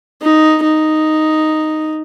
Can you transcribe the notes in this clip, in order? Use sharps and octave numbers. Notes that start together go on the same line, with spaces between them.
D#4
D#4